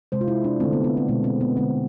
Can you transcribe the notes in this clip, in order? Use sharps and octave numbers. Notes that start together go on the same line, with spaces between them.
C3 G#3 C5
F4
E4
D4
D3 A3 C4
B3
B3
C4
B2 G#3 B3
C4
B3
D3 G#3 C4